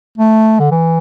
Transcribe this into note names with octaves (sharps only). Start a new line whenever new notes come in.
A3
D3
E3